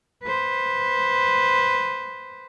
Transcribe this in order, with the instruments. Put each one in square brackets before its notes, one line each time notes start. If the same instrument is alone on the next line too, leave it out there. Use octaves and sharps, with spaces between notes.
[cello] B4 C5